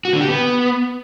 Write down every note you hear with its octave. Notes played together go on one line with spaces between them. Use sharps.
F#4
D3
G4
B3